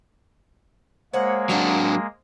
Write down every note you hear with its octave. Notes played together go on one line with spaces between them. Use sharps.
G#3 A#3 C5 C#5 F#5
F#3 D4 F#5 G5 A#5